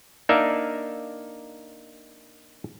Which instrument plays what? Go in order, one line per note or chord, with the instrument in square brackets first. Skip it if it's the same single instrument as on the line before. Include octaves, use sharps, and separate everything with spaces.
[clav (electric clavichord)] A#3 D4 D#4 A#4 D5 E5